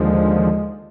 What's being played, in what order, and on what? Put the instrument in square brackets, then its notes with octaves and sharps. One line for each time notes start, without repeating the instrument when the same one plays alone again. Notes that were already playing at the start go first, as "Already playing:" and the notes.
Already playing: [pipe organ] D#2 D3 F3 [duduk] G#3